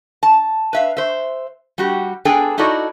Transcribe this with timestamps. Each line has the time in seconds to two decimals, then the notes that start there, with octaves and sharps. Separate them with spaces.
0.23 A5
0.73 B4 E5 F5
0.97 C5 E5
1.78 G3 F#4 G4
2.25 B3 D4 G#4 A4 G5 G#5
2.58 D#4 E4 F#4 A4 D5 D#5